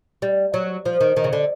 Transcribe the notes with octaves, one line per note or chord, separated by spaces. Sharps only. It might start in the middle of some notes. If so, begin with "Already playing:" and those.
G3
F#3
F3
D#3
D#3
C#3
D3